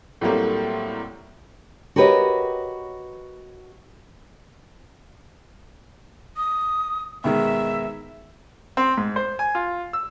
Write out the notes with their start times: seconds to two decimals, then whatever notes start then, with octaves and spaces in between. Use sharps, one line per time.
0.21 A2 F#3 G3 A3 A#3 C4
1.96 F#4 G4 A#4 B4 C#5 D#5
6.37 D#6
7.24 B2 D#3 G#3 E5
8.77 C4
8.98 G#2
9.16 C5
9.39 G#5
9.55 F4
9.93 E6